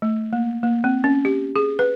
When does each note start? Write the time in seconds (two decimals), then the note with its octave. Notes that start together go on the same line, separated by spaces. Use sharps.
0.02 A3
0.33 A#3
0.63 A#3
0.84 C4
1.04 C#4
1.25 G4
1.56 G#4
1.79 B4